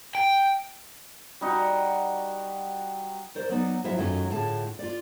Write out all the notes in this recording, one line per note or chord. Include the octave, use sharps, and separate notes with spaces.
G5
G3 D#4 F#4 F#5
A#4 C5 D5
F#3 B3 D#4 D5
F3 F#3 E4 F4 E5
F#2 D#3 F#3 A3 C#4 F4
A2 D3 F4 G#4 A5
F4 D5